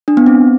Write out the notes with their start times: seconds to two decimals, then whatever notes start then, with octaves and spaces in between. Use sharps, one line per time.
0.08 D4
0.17 B3
0.26 C4